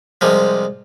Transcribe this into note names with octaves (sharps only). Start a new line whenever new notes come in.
C2 C3 F3 G#3